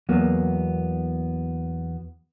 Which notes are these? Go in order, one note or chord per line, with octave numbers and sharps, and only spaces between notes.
E2 F#3 A#3 B3